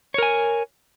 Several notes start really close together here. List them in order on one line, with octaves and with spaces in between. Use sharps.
C#5 A#4 G#5